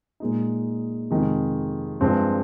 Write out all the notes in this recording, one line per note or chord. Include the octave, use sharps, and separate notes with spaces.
A#2 G#3 D#4
F2 C3 D#3 G#3
G2 F3 G#3 C4